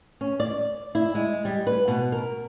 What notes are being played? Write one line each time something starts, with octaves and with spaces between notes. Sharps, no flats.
C#4
D5
E4
G#3
G3
B4
B2
A#4